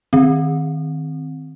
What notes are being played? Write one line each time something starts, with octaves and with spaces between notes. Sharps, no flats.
D#3 C4